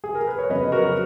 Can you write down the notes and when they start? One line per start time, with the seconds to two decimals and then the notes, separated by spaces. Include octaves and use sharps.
0.04 G#4
0.15 A#4
0.27 B4
0.38 C#5
0.49 F2 C#3 F#3 B3 B4 D#5
0.72 F#4 A#4